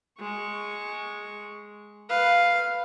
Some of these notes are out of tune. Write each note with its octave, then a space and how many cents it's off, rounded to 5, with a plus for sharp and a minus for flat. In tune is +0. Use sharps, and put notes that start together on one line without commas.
G#3 +0 C#6 +0
B4 +0 F5 +0